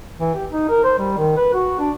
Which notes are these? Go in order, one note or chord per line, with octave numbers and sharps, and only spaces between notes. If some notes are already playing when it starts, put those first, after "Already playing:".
E3
G4
D#4
A#4
C5
G3
D#3
B4
F#4
D4